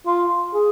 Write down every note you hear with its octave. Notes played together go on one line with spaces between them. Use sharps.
F4
G#4